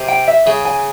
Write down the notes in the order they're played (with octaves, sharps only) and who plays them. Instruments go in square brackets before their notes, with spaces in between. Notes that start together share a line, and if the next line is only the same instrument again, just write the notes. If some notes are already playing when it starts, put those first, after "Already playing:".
Already playing: [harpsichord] C3
[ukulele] G5
E5
[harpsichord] C#3 [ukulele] G#4
[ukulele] G#5